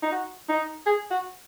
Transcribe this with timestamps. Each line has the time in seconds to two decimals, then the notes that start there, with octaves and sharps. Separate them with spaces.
0.02 D#4
0.12 F#4
0.49 D#4
0.86 G#4
1.11 F#4